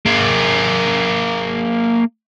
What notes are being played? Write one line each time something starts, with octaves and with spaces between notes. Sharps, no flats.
A#3 G#4